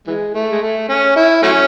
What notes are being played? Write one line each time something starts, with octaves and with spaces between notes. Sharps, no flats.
E3 G#3
A3
G#3
A3
C#4
E4
F#3 A3 C#4